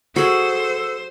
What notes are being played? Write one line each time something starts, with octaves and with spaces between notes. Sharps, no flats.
F#4 G#4 A4 C5